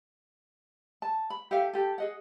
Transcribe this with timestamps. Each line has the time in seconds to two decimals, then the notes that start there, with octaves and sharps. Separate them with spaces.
1.02 A5
1.30 B5
1.51 G4 A4 E5 F5
1.73 G4 A4
1.98 G#4 D#5 F#5